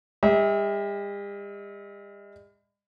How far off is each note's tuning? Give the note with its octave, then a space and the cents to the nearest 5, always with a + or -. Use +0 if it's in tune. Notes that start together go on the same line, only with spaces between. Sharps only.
G3 +45 E5 -40